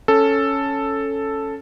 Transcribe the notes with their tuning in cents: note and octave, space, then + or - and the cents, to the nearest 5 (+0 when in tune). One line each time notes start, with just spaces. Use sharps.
C#4 +0 A4 +0